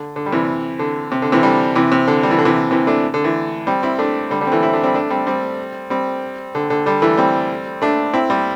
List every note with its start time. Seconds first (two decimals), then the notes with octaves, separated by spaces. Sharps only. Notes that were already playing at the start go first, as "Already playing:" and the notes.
Already playing: D3
0.16 D3
0.26 G3
0.32 C3 E3
0.79 D3
1.12 C3
1.22 D3
1.32 C3 E3
1.43 D3 G3
1.75 C3 E3
1.92 C3
2.07 D3
2.23 G3
2.31 E3
2.38 D3
2.45 C3 E3
2.71 C3 E3
2.87 A3 D4
3.14 D3
3.24 E3 A3
3.67 G3 C4
3.83 C4 E4
3.99 A3 D4
4.30 D3 G3
4.41 D3 G3
4.47 C4
4.52 E3 A3
4.63 C4 E4
4.73 A3 D4
4.84 G3 C4
4.94 A3 D4
5.10 G3 C4
5.27 G3 C4
5.90 G3 C4
6.55 D3
6.70 D3
6.86 D3 G3
7.02 E3 A3
7.17 G3 C4
7.82 A3 D4
8.13 C4 E4
8.30 G3 C4